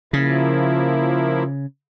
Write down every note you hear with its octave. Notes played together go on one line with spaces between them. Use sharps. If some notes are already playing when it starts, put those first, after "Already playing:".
C#3 F3 A#3 E4